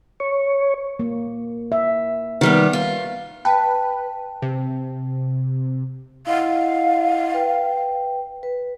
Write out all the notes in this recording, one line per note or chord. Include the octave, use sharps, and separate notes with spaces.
C#5
A#3
E5
D#3 G3 B3
F4
B4 G5 A5
C3
E4 D#5 F5 F#5
B4 G5
B4